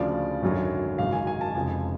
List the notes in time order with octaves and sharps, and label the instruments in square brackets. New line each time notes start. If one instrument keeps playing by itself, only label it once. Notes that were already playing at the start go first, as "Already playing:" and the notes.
Already playing: [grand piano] D2 C#3 F3 D5
G#1 F#2 D3 F#3
G#1 F#2 C#3 F#3 F5
G#5
G#5
A5
F1 F2 C#3 G#3 G#5